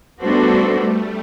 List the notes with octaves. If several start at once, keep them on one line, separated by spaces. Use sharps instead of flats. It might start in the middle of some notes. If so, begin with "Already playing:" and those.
G3 A3 B3 D4 F#4 A4 C5